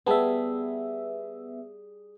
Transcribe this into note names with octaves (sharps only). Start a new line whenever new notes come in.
G3 B3 G#4 E5 A5